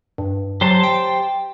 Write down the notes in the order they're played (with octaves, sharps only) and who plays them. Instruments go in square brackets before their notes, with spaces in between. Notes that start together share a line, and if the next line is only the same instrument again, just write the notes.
[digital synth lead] G2
[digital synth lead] F#3 [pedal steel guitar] G4 C5 A5
[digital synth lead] G5